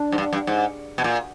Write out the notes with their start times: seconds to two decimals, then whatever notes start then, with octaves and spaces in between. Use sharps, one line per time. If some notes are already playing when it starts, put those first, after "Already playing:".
Already playing: D4
0.12 G#2
0.18 G2
0.33 G2
0.47 G#2
0.98 B2
1.04 A#2